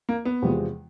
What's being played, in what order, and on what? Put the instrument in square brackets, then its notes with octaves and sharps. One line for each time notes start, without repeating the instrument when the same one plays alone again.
[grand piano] A#3
B3
[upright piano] E2 C3 F3 G#3